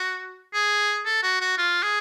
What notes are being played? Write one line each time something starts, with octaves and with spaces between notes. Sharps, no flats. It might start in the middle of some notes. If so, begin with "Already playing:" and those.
Already playing: F#4
G#4
A4
F#4
F#4
F4
G#4